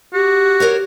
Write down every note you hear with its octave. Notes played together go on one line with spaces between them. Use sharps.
F#4 G4
A#4 C5 C#5